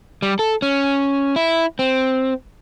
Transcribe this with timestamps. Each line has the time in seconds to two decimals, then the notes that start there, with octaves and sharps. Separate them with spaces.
0.22 G3
0.39 A4
0.62 C#4
1.36 E4
1.79 C4